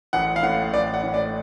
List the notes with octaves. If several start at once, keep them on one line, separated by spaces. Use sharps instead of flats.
A1 F#5
F5
A2 F#5
A1 D5
F#5
A2
D5